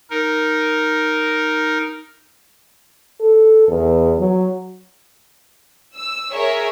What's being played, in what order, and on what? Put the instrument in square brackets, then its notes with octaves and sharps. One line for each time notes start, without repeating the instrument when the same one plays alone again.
[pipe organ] D#4 A#4
[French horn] A4
E2
F#3
[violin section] E6
G#4 A#4 C#5 E5